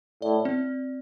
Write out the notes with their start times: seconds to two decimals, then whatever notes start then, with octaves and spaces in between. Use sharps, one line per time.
0.22 A2 D5
0.45 C4